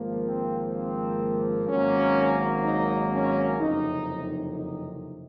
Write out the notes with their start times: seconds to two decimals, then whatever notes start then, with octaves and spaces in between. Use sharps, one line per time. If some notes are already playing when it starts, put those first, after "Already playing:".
Already playing: G#1 G#2 F3 A#3
0.25 C4
0.72 C4
1.68 G#1 G#2 F#3 A#3 C#4
2.64 D#4
3.11 C#4
3.59 F#1 F2 C3 D#4
4.54 D#4